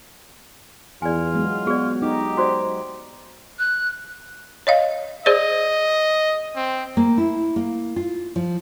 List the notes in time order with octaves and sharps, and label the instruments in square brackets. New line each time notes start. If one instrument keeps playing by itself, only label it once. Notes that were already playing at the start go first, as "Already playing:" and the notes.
[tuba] E2 [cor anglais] F4 [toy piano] D5 G#5
[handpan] F#3 G#3 B3
[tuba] B3 [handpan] F#4 [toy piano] G#4 D5
[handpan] D#4 [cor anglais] G4
[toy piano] F#4 C5 D5
[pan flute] F#6
[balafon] C#5 D#5 F5
[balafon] G#4 C5 D5 [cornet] D#5
[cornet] C4
[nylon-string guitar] A#3
E4
A#3
F4
F3